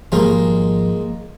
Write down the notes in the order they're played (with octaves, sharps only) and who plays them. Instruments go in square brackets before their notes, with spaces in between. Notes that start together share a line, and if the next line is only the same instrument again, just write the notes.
[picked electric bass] G#1 F3 G3 [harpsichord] G#3 A#3 F4